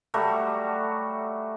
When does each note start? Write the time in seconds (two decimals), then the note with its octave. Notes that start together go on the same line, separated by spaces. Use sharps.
0.14 F#3 G3 A3 F#4